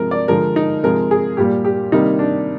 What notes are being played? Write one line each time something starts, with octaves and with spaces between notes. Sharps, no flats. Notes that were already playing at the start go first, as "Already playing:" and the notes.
Already playing: C3 F3 G#3 A#4
D5
D3 F3 G#3 A#4
D#4
C3 F3 G#3 A#4
G#4
A#2 G3 A#3 G4
G4
C3 D#3 G3 A#3 D#4
D4